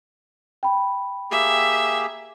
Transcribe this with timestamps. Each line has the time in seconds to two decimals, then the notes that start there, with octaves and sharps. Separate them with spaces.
0.63 G5 B5
1.31 A#3 G4 G#4 E5